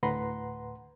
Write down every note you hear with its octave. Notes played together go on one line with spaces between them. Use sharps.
D2 A2 B4 F#5 A#5 C6